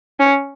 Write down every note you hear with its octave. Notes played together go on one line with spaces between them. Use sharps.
C#4